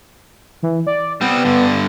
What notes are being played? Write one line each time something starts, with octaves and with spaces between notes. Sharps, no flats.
E3
D5
G3 B3 C4
G2 D3